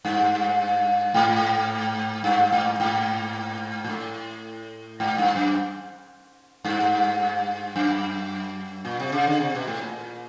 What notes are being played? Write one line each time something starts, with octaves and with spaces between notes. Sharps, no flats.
G2
G#2
G2
G#2
G#2
A#2
A2
G#2
G2
F#2
G2
F#2
A#2
C3
C#3
D3
C3
B2
A2
A#2